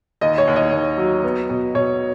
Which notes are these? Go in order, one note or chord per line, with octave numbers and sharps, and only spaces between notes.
D#2 D#5
C#5
D#2
D#5
D#2
F#3
B3
B2
B2 C#5